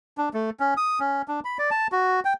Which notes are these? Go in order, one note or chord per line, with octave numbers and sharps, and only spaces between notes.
D4
A3
C#4
D#6
C#4
D4
B5
D5
A5
F#4
G5